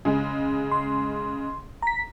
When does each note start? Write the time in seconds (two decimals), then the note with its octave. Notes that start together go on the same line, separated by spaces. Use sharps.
0.05 C#3 G#3
0.71 C6
1.82 A#5 B6